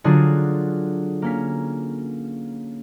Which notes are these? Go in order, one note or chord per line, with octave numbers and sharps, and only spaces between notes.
D3 F#3 D4 F4 F#4 G#4
A#3 C#4 B6